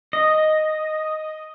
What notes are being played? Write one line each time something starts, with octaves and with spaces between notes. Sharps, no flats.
D#5